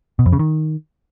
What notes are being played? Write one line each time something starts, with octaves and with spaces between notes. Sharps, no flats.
B2
F2
C#3
D#3